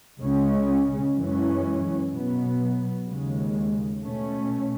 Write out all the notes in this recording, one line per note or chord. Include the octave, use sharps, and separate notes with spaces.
C#2 C#3 G#3 C#4
F#2 E3 G#3 C#4
B2 F#3 B3
D#2 C#3 G#3
B2 A3 C#4